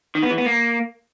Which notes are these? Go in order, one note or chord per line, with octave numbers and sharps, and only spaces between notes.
D#3
B3
E3
B3
A#3